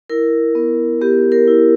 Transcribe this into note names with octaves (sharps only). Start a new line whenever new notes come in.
E4 A#4
B3
B3 G4
A#4
E4